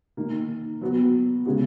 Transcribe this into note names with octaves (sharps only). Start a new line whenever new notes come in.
D#3 A#3 D#4
F#3 B3 F#4
C#3 G#3 B3 F#4